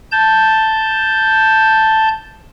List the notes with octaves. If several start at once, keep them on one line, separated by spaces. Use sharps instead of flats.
A5 G6